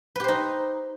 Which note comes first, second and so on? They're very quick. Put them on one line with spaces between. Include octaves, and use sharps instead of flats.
B4 G4 C5 D#4